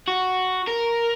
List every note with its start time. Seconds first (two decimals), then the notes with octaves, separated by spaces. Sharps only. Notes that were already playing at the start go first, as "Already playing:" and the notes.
0.08 F#4
0.67 A#4